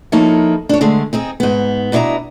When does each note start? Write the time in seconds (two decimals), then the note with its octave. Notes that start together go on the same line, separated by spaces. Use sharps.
0.12 F3 A#3 D#4 E4 A4 C#5
0.69 D4 C#5
0.81 D3 G#3 A3
1.13 C4 D#4 G#4
1.40 G#2 B3
1.92 B2 D4 E4 C#5 D#5 A#5